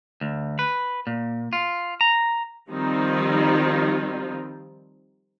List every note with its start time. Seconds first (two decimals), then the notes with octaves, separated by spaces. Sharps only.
0.21 D2
0.59 B4
1.07 A#2
1.53 F4
2.01 A#5
2.69 D#3 F3 G3 C4 D#4 F4